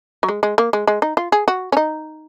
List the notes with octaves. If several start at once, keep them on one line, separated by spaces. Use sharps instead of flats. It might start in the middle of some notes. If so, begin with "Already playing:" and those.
F#3
G#3
G#3
A#3
G#3
G#3
D#4
F4
G#4
F#4
C#4
D#4